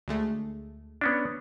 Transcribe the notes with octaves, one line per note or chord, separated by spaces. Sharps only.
D2 G#3 A3
B3 C#4 D4